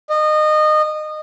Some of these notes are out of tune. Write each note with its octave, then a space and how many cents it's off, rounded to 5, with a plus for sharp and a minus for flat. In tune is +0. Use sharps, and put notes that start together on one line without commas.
D#5 -25